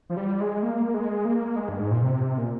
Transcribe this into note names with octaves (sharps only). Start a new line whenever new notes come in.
F3
G3
G#3
A#3
G#3
A#3
G#3
G2
G#2
A#2
C3
A#2